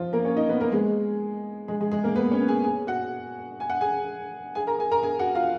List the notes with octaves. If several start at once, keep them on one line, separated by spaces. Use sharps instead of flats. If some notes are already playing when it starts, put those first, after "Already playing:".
Already playing: F3 F4
A#3 A#4
C#4 C#5
D#4 D#5
B3 B4
A#3 A#4
G#3 G#4
G#3 G#4
G#3 G#4
G#3 G#4
A#3 A#4
B3 B4
C#4 C#5
G#4 G#5
G#4 G#5
F#4 F#5
G#5
F#5
G#4 G#5
G#4 G#5
A#4 A#5
G#4 G#5
A#4 A#5
G#4 G#5
F#4 F#5
F4 F5